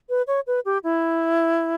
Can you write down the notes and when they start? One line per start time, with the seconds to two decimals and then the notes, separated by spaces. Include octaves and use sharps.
0.09 B4
0.27 C#5
0.47 B4
0.65 G4
0.84 E4